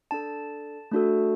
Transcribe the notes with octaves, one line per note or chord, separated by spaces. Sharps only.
D4 A4 A5
A3 D4 F#4 A4